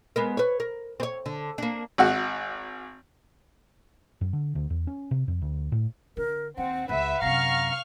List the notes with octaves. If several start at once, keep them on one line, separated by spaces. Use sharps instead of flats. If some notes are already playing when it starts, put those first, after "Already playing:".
G#3 B3 A#4
B4 C#5
A#4
C4 C#5
D3
A#3 D4
G#1 F#4
F#2
D3
D2
E2
C#4
C3
F2
D2
A2
D3 A#4
D#2 C4 F#5
C#2 B4 E5 F#5
F#2 C3 F5 A#5 C#6 F6